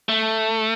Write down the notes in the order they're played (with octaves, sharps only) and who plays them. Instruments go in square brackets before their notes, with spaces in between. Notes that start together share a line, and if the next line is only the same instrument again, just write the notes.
[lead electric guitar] A3